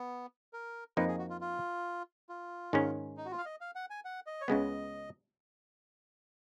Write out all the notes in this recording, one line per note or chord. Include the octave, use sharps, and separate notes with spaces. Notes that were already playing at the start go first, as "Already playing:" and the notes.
Already playing: B3
A#4
F2 F3 A#3 D#4 B4
G#4
F#4
F4
F4
F4
G#2 D#3 G#3 C#4
D#4
F#4
F4
F5
D#5
F5
F#5
G#5
F#5
D#5
C#5
C#2 C#3 G#3 B3 D#5